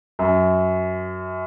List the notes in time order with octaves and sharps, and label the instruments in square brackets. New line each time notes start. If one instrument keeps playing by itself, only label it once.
[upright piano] F#2